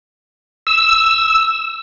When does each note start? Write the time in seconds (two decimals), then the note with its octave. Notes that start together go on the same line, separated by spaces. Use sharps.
0.67 E6